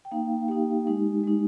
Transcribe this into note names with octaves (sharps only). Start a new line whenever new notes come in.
G5
A#3 D#4 F5
A#3 D#4 G4
G#3 D#4
G#3 D#4